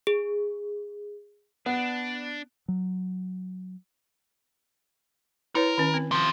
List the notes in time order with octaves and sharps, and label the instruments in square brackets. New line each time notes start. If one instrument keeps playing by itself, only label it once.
[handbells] G#4
[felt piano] B3 [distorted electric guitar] D4
[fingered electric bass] F#3
[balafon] E4 B4 C#5 [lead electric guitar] A#4
[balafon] D#3 C#4
C4
[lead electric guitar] C3 F3